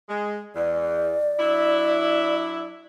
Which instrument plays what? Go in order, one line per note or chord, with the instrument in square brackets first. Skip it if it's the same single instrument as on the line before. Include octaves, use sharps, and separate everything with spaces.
[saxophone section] G#3
[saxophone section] E2 [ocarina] D5
[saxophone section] F#3 D4 E4